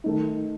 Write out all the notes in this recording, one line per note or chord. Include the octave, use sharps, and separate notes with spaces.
D#3 A3 D#4